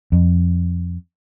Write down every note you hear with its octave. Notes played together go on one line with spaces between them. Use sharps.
F2